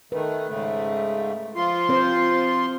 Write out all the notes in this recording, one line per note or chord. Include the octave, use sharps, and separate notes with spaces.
D#3 A3 B4
G#2 C#3 A3
F3 F4 C6
C4 C5